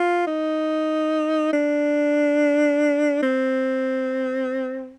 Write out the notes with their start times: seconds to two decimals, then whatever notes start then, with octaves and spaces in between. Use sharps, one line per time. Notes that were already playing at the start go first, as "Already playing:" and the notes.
Already playing: F4
0.27 D#4
1.53 D4
3.23 C4